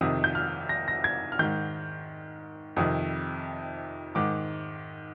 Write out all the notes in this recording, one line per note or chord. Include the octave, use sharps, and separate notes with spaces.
F2 C3 D#3 D#6
G6
F6
A#6
A#6
G#6
F6
G#2 D#3 G6
F2 C3 D#3 D#6
G#2 D#3 D6